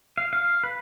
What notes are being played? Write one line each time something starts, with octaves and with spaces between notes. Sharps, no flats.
F5
F5
B4